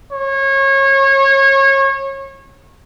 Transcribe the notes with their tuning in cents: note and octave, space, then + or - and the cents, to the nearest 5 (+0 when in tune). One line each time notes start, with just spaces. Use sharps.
C#5 -25